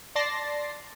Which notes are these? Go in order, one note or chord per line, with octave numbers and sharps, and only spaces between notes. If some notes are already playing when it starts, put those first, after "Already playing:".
D5 A5 C6 A6 A#6 C7